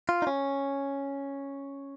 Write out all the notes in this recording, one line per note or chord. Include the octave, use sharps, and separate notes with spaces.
F4
D#4
C#4